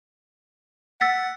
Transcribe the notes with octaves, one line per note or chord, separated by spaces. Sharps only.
F#5 E6 A6 B6